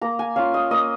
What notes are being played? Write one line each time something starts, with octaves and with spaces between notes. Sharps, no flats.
A#3 A#5
G#5
C#4 F4 F5
D#5
A#3 D#5